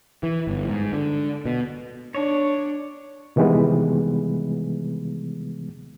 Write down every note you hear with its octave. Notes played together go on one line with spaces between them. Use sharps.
E3
G1
G#2
D3
B2
D4 C#5
C3 D#3 E3 G3 G#3 B3